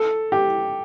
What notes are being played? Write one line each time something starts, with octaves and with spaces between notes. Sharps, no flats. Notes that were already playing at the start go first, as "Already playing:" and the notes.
Already playing: A4
G4